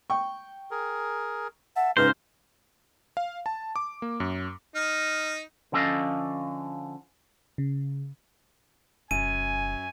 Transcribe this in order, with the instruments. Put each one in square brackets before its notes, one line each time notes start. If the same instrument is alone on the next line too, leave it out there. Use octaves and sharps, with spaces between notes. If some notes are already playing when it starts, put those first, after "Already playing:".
[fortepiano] G5 C#6
[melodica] G#4 A#4
[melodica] E5 A5 [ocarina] F#5
[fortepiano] G#2 C#3 F6 [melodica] F4 A#5 [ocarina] B4 [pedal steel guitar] C5
[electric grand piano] F5
A5
D6
A#3
F#2
[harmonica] D#4 [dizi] F6
[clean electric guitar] D3 F3 C#4 A4 D#5 F5
[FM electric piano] C#3
[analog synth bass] F1 [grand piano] F#2 [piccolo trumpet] G#5 [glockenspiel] D#7